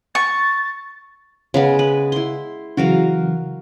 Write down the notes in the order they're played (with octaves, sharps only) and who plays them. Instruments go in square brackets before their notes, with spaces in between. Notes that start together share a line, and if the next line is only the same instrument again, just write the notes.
[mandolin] C#6 [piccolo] A6
[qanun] C#3 G#3 B3
B4
E4 C6
[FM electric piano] C#3 E3 F#3 [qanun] F#4 A#4 F5